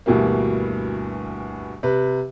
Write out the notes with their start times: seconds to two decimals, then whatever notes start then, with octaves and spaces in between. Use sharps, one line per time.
0.06 D2 G2 B2 E3 G3 A#3
1.83 C3 B4